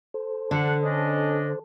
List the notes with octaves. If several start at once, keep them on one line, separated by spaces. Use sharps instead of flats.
A4 C5
D3 D4 F#5
C#4 D4 D#5